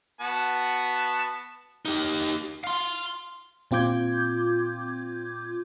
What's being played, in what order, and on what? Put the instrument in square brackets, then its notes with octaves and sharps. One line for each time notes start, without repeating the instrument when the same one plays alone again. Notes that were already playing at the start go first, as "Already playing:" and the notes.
[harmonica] B3 F#4 A5
[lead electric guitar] D#4 G4
F5 C6
[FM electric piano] A#2 C4 F4 D6 G6 G#6